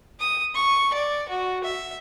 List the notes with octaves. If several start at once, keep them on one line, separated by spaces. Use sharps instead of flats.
D#6
C#6
D5
F#4
E5